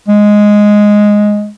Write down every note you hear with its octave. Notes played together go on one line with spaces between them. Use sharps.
G#3